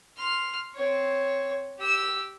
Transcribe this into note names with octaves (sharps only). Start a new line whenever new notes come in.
C6 F6
C4 C#5
G4 E6